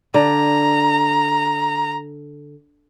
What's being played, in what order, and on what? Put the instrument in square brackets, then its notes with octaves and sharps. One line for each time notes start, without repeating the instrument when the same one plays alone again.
[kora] D3 [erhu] A#5